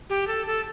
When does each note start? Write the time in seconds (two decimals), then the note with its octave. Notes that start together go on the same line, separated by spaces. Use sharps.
0.10 G4
0.27 A4
0.47 A4